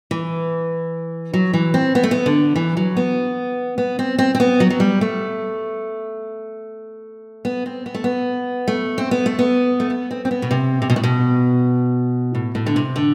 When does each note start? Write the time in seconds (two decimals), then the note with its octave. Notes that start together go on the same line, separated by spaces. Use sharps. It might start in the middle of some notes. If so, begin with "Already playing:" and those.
0.11 E3
1.34 F#3
1.53 E3
1.74 C4
1.95 B3
2.03 A3
2.11 B3
2.26 D3
2.56 E3
2.77 F#3
2.97 B3
3.78 B3
3.99 C4
4.19 C4
4.35 C4
4.40 B3
4.60 F#3
4.70 F#3
4.80 G3
5.01 A3
7.45 B3
7.66 C4
7.86 B3
7.94 A3
8.04 B3
8.68 A3
8.98 C4
9.11 B3
9.26 A3
9.39 B3
9.80 A3
9.90 B3
10.11 C4
10.25 C4
10.31 B3
10.42 B2
10.51 C3
10.82 C3
10.90 B2
10.96 A2
11.03 B2
12.35 A2
12.55 A2
12.66 D3
12.76 C3
12.96 D3